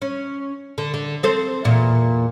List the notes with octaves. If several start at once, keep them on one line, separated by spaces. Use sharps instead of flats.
C#4
D3
D3
C4 A4 C5
E2 A#2